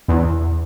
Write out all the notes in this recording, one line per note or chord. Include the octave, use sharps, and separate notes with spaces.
E2